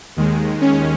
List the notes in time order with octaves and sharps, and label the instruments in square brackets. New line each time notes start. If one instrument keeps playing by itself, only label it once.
[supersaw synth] D#2 D#3 G#3
C#4